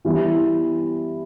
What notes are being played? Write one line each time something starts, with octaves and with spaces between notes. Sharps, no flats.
E3 G3 B3 E4